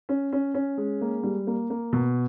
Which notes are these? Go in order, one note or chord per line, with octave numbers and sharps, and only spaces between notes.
C#4
C#4
C#4
G#3
A#3
G3
A#3
A#3
B2